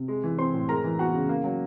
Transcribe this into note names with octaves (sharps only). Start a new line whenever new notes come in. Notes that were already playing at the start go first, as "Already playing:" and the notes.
Already playing: C3
G#3
E3
C4 C5 C6
A2
G#3 A#4 A#5
E3
B3 F#4 F#5
C#3
A#3
F#3